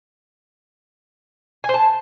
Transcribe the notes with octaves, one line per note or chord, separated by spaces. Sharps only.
G#5
C5
A5